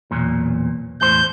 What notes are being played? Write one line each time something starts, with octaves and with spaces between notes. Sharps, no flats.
B1 E2 A#2
E2 A2 C5 G6